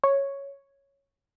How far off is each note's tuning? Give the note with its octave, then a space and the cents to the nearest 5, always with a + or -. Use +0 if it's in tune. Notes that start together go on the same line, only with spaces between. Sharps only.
C#5 +0